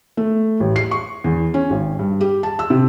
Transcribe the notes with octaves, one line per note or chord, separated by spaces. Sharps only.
A3
A1
C7
C#6
E2
C#4
G#1
G2
G4
A5
E6
C3